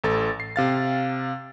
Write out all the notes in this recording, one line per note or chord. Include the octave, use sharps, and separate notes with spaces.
A1 A4 A6
C7
C3 F5 A6